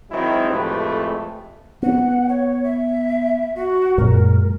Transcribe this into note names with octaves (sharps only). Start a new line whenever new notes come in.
D#3 F#3 G#3 C4 E4
F2 A2 G#3 A3 G4 B4
B3 F#5
C#5
E5
F#4
F#2 A#2 G#3 A#4